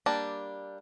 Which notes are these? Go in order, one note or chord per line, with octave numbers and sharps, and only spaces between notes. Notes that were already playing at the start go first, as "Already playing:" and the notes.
G3 A#3 D4